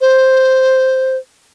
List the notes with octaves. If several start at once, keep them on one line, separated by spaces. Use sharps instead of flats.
C5